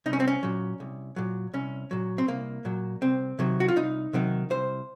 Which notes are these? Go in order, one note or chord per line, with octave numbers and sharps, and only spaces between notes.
C2 D#4
C#4
C4
C#4
A#2 F#3
C2
A#2 F#3
C2 C#4
A#2 F#3
C4
C2 A#3
A#2 F#3
C2 C4
C3 D#3 F#3
F#4
F4
C2 D#4
C3 D#3 F#3
C2 C5